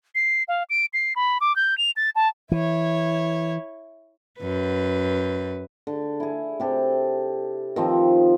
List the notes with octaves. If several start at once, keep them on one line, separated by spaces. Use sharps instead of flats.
C7
F5
D7
C7
B5
D6
G6
F7
A6
A5
E3 E4 C#5
F#2 B4
D3
E4 G#4
C3 G4 A4
D#3 F3 C4